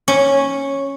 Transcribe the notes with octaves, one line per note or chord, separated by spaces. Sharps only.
C#4